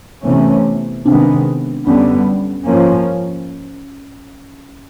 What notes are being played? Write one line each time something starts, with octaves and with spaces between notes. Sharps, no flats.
C3 E3 A3 B3 C#4
C3 D#3 G#3 B3 C4 D4
F#2 D3 G3 B3 C#4
G#2 F3 A#3 C#4